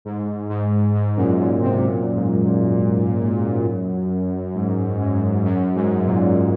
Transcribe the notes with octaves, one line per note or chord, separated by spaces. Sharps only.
G#2
G#2
G#2
F#2 A#2
F#2 A#2
G#2 C3
F#2 A#2
G#2
F#2
G#2
G#2
F#2
G#2
F#2 A#2